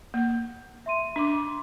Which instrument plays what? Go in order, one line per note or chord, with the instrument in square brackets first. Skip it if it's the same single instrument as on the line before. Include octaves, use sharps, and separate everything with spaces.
[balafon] A#3
[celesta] E5 C6 D#7
[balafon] D4 [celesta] C6 D6